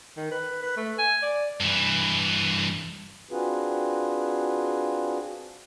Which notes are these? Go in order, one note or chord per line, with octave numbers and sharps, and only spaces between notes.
D#3
B4
B4
A3
G#5
D5
G2 E3
C4 D4 F4 F#4 G#4 B4